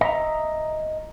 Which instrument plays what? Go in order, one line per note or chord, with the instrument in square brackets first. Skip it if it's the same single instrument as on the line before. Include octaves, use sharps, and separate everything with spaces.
[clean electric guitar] D#5 E5 A#5